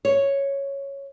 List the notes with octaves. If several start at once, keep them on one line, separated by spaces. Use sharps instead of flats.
C#5